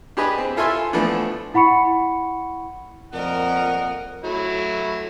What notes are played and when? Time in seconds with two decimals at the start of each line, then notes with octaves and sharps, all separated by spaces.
0.17 D4 G4 G#4 B4 D#5
0.38 C4
0.57 E4 F4 A4 E5 G#5 C6
0.93 E3 F3 A3 B3 D4
1.54 E4 F#5 B5 C#6 C#7
3.13 F2 A#2 A#4 D#5 F#5
4.24 F#3 A3 E4